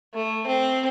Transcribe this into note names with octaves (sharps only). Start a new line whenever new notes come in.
A3
C4